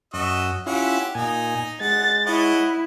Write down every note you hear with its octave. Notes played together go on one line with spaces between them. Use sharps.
F#2 F#4 D#5 E5
C#4 E4 F4 G4 E5 F#5
A#2 D#4 G#5
G#3 F#5 A6
E4 C#5 D#5 F#5